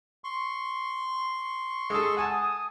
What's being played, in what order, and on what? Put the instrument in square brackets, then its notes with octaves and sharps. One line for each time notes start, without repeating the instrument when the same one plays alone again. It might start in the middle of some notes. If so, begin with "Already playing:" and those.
[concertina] C6 C#6
[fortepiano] G#3 A4 [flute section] D#6 E6
[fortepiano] F#5 G#5 A5 [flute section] D#6